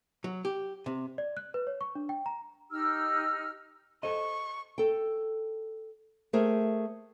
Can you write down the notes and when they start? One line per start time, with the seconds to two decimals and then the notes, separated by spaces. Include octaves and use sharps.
0.24 F#3
0.45 G4
0.86 C3
1.18 D5
1.37 F#6
1.54 B4
1.67 C#5
1.81 C#6
1.95 D4
2.09 G5
2.26 A#5
2.70 D#4 G4 E6 F6
4.03 A4 C5 D#5 C#6
4.78 A4 G5
6.33 A3 G#4 A#4 C5 G5